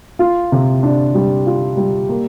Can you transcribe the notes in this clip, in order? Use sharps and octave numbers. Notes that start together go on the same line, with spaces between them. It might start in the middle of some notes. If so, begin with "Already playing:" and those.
F4
C3
D4
G3
F4
G3
A#3